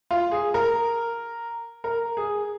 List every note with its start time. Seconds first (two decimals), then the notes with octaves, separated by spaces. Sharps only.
0.11 F4
0.31 G#4
0.54 A#4
1.84 A#4
2.17 G#4